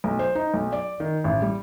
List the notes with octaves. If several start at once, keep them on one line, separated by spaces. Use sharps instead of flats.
B1
C5
D#4
B1
D5
D#3
A1
G3